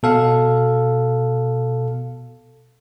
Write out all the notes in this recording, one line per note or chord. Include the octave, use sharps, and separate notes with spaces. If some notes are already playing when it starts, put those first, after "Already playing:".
B2 A4 F5